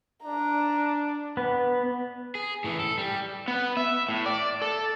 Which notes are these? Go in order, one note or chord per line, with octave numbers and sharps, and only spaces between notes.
D4 A#5
B3
G#4
A2 E3
A4
G3
B3
E5
A2
D5
A4